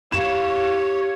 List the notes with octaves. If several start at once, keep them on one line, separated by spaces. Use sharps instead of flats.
E4 G4 C#5 F5 E7